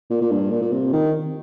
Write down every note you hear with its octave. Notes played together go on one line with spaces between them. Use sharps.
A#2
A#2
G2
A#2
A#2
C3
D#3